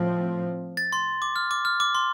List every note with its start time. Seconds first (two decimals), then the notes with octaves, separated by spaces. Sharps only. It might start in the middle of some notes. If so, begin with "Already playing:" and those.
Already playing: A2 F3 C4
0.77 A6
0.93 C6
1.22 D6
1.36 F6
1.51 D6
1.65 F6
1.80 D6
1.95 C6